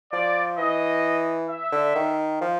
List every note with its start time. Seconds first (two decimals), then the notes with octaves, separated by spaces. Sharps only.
0.12 F3 D5
0.58 E3 D#5
1.49 E5
1.72 D3
1.95 D#3
2.41 F3